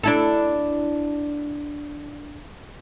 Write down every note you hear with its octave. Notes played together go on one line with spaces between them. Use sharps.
D4 E4 A4